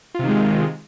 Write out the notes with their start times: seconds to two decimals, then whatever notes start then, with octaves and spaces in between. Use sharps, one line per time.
0.14 F4
0.19 C3
0.24 D#3
0.28 G#3